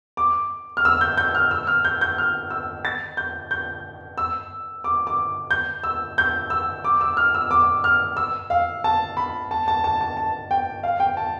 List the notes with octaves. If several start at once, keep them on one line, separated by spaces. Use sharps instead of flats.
D6
F6
E6
G6
G6
F6
E6
F6
G6
G6
F6
E6
A6
G6
G6
E6
D6
D6
G6
E6
G6
E6
D6
E6
F6
E6
D6
F6
E6
F5
A5
B5
A5
A5
A5
A5
A5
G5
F5
G5
A5